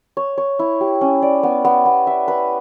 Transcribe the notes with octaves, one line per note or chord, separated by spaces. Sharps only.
C#5
C#5
E4
G4
C#4
D5
B3
B3
B3
E5
B4